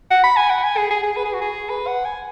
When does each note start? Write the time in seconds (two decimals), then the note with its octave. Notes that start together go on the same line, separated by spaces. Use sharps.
0.11 F#5
0.24 B5
0.37 G#5
0.50 F#5
0.64 G#5
0.77 G#4
0.90 G#4
1.03 G#4
1.17 B4
1.25 G#4
1.33 F#4
1.41 G#4
1.70 B4
1.87 F#5
2.05 G#5